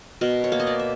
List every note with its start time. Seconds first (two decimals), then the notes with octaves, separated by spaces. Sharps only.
0.21 B2 A#4
0.44 C#5
0.52 A#3
0.60 D#5
0.67 D5
0.80 E5